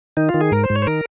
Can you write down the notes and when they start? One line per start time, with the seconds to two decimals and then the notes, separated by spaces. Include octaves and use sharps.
0.17 D#3 D#4
0.29 F4
0.34 D#3
0.41 G#4
0.52 G#2 A#4
0.64 C5
0.70 G#2
0.76 C#5
0.82 C5
0.87 D#3 A#4